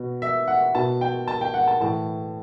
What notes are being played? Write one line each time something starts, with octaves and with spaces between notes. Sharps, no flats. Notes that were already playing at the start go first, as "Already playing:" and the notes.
Already playing: B2
E5
F#5
B2 A5
G5
A5
G5
F#5
A5
A2 E3 A5